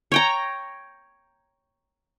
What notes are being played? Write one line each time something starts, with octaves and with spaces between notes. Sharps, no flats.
C#5 G5 A#5